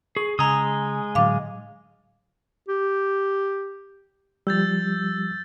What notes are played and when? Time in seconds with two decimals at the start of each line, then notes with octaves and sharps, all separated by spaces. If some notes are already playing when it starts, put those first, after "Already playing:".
0.16 G#4 C#6
0.39 C#3 G#3 G#5 A#5 D#6 G#6
1.15 A2 D3 F#3 F5 D6
2.68 G4
4.47 F3 G3 E6 G6 A6